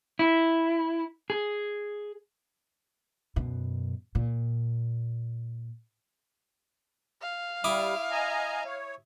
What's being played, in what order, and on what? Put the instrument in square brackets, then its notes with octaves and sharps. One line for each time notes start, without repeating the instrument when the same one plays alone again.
[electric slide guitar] E4
G#4
[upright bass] F#2 B2
A#2
[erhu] F5
[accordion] G3 [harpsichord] E4 D6 D#6
[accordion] D#5 G#5 A#5
C#5